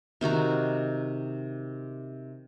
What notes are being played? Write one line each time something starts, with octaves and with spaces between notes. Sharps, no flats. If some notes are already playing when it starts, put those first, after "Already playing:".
C3 D#3 F#4 A#5